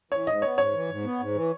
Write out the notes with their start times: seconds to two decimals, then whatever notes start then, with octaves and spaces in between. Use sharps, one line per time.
0.11 E3 C#5
0.27 G#2 D#5
0.42 B3 C#5
0.57 G#2 C#5
0.73 E3
0.89 G#2
1.05 B3
1.20 G#2
1.35 E3